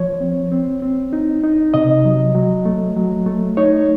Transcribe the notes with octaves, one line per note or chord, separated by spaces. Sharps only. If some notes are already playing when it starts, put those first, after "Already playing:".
Already playing: F3 C#5
C4
C4
C4
D#4
D#4
C3 D#5
F#3
F#3
A3
F#3
A3
D#4 C#5